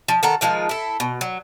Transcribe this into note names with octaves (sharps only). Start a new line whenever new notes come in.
F3
D#3 A4 F#5 A#5
D#3 F3 G#3 F4
E4 A4
B2
F#3